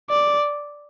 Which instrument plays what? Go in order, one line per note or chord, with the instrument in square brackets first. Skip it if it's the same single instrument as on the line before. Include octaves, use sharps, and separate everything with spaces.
[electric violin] D5